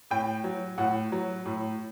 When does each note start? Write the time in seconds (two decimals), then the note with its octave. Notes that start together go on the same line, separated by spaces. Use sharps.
0.11 A2 G5
0.44 F#3
0.78 A2 F#5
1.12 F#3
1.45 A2